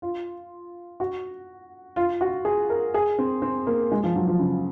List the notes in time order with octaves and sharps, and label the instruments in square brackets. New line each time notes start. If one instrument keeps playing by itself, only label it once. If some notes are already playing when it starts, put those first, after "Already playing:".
[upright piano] F4
F#4
F4
F#4
G#4
A#4
G#4
C4
C4
A#3
G#3
F3
F#3
F3
C#3